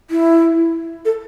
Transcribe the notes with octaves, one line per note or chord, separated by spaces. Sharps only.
E4
A4